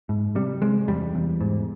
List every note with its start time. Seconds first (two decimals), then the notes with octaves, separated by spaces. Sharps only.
0.09 G#2
0.35 C3 G3
0.62 C3 G#3
0.88 E2 G3
1.15 E2
1.41 G#2